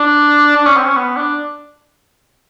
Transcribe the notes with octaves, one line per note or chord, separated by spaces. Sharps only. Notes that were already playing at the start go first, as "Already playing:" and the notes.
Already playing: D4
D4
C#4
C4
C#4
B3
D4